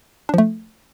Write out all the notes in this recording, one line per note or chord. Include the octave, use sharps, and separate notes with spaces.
F3 A3 D4